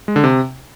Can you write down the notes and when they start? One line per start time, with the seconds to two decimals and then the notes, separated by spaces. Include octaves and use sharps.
0.08 G#3
0.16 D3
0.24 C3